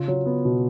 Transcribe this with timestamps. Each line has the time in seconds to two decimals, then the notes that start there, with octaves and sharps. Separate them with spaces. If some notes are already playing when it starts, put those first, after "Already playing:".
Already playing: C#3 F4
0.08 F#3
0.26 B3
0.45 B2